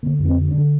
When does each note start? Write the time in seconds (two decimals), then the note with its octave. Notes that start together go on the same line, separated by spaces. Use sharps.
0.03 D3 A#3
0.19 F2
0.25 C4
0.36 D3
0.48 D4
0.54 D3